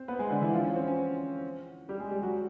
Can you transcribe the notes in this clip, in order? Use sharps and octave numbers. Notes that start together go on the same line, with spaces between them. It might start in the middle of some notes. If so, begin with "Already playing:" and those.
Already playing: C4 C5
B3 B4
G#3 G#4
D3 D4
E3 E4
F3 F4
C#4
C4
C#4
G3 G4
G#3 G#4
G3 G4
F#3 F#4